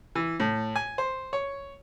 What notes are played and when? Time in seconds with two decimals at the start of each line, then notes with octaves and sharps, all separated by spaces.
0.15 E3
0.40 A2
0.76 G#5
0.98 C5
1.33 C#5